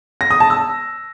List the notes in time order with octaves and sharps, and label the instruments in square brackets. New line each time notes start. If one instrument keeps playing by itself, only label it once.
[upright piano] A#6
D#6
A5
E6